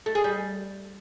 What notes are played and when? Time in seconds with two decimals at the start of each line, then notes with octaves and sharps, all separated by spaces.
0.06 A3
0.15 G#4
0.24 G3